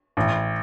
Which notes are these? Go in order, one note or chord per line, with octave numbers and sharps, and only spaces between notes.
A1